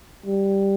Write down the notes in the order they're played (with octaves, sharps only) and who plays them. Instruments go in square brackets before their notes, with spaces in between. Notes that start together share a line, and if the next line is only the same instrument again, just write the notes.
[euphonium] G3